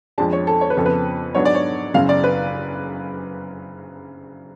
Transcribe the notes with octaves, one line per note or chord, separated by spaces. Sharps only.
F2 F3 G#3 D4 A5
C#5
A4
C#5
B4
F2 C#3 F3 B3 A4
B4
G#2 F#3 B3 D4 C#5
D5
C#5
F#1 F#2 C#3 F5
D5
B4